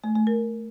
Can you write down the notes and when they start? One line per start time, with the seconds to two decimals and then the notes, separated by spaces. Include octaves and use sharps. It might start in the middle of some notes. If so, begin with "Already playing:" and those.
0.04 A3
0.15 A3
0.27 A#4